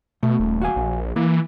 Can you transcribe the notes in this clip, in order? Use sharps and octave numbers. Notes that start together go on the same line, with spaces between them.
B2 A3
D#1
F#4 F5 G#5
A#1
E3 A#3